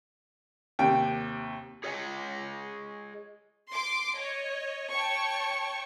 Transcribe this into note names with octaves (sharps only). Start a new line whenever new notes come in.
D#2 C3 G5
G#4 C#5 D#5 G5 G#5
C6 D6
C#5 D#5
C#5 G5 A5 C#6